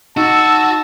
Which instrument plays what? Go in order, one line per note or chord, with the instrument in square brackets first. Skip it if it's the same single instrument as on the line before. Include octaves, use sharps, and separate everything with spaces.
[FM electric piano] D#4 [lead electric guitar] F#4 [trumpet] A5 [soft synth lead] E6